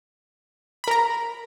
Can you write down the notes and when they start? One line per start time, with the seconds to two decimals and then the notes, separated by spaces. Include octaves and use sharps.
0.84 B5
0.88 A#4
0.91 A#5